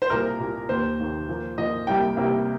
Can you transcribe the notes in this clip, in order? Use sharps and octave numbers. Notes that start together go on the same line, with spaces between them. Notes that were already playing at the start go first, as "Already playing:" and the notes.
C5
C2 A#2 A#3 A#4
C2 A#2 A#3
D#2 D#3 A#3 C5
D#2 D#3 A#3
A#2 F3 A#3
A#2 F3 A#3 D#5
C2 C3 G3 A#3 G5
C2 C3 G3 A#3